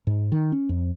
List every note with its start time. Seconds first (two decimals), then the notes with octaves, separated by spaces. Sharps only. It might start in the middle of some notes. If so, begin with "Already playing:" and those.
0.07 G#2
0.32 D#3
0.52 C#4
0.69 F2